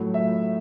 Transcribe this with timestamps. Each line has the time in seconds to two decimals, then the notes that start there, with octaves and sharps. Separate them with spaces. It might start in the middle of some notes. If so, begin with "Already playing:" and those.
Already playing: A2 F#3 A3
0.14 E5